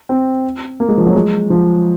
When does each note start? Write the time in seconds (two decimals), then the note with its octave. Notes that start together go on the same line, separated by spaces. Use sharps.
0.09 C4
0.80 A#3
0.89 G#3
0.97 F3
1.06 F#3
1.15 G#3
1.50 F3